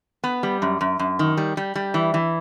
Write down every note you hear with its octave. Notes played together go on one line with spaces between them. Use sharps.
B3
G3
F#2
F#2
F#2
D#3
G3
G3
G3
E3
E3